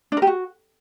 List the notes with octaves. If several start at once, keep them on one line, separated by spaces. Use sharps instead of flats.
D4
A#4
G4
F#4